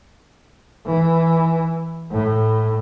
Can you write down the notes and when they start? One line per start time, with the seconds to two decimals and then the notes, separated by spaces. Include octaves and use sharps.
0.86 E3
2.11 A2